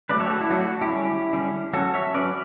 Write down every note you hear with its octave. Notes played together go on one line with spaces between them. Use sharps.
F#3 A3 D4 B4 D5
A4 C#5
G4
F#4 A4
E4
F#3 A3 D4 F#4
F#4
E4 G4
D3 G3 C#4
D3 G3 C#4
F#3 C#4 F#4 A4
C#5 E5
F#3 C#4 B4 D5